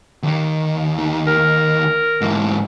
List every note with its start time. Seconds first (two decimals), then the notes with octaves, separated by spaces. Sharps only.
0.23 D#2 D#3
1.27 A#4
2.21 G#2 E3